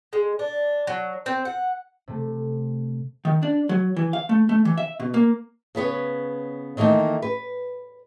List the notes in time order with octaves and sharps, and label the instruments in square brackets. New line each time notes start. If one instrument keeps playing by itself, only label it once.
[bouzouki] G#3
D4
F#3
C4
F#5
[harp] C3 A3
[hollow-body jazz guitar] D#3
D4
F#3
E3
F5
A3
A3
E3
E5
B2
A#3
[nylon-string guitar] C#3 B3 B4 C#5
D#3 E3 A3 A#3 D#4
B4